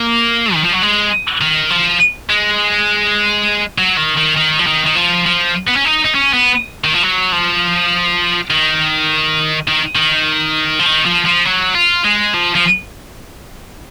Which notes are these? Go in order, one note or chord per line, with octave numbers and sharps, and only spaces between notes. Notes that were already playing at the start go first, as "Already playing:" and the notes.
Already playing: A#3
D#3
F3
F#3
G#3
D#3
F3
G#3
F#3
D#3
D#3
D#3
F3
D#3
D#3
F3
F3
B3
C#4
D#4
D#4
C#4
B3
D#3
F3
F#3
F3
D#3
D#3
D#3
F3
D#3
F3
F3
F#3
F4
G#3
F3
F3